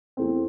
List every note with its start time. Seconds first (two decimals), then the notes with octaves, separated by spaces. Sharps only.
0.17 E2 E3 A3 C4